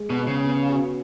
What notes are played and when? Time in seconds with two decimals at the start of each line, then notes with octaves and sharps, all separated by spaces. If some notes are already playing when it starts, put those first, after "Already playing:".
Already playing: G#3
0.10 B2
0.18 B3
0.27 C#3
0.44 B3
0.70 F#4